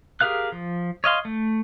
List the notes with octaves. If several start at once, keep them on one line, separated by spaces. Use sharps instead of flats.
G4 G#4 A#4 F5 F#6
F3
C#5 D#5 F5 C6
A3